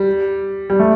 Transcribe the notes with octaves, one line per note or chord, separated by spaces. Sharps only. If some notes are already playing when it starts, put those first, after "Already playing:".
Already playing: G3
G3
A3